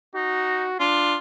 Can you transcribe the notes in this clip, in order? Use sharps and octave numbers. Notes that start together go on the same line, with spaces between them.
D#4 F#4
D4 F4